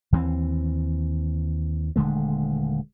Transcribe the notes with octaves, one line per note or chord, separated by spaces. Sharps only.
D#2 E3 A3 C4
D#1 D3 G#3 A3